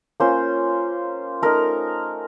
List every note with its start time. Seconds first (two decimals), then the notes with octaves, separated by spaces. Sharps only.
0.20 A#3 C#4 F4 C5
1.42 A3 D#4 A#4